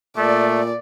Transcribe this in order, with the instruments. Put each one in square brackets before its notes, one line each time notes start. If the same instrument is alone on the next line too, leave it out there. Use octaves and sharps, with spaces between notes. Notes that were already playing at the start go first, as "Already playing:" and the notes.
[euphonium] A#2 [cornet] A3 [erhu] D5